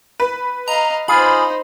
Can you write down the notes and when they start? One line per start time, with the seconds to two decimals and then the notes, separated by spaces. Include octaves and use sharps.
0.20 B4
0.68 D#5 F5 A#5
1.08 D#4 F4 G#4 C5 B5